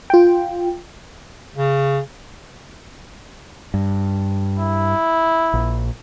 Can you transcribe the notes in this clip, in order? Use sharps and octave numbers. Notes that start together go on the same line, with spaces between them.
F4 G5
C#3
G2
E4
A#1